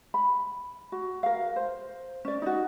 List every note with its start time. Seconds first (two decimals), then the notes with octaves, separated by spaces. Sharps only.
0.14 B5
0.92 F#4
1.23 A#4 F5
1.56 C5
2.25 C#4 D5
2.42 D#4 F#4